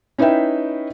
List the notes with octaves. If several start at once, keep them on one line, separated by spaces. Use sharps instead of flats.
C#4 D#4 E4 B4 E5 G5